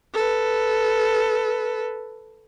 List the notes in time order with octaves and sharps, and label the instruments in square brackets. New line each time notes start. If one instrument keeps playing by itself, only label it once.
[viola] A4 B4